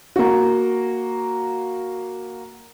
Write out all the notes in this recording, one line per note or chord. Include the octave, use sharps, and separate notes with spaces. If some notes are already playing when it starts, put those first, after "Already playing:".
A#3 F#4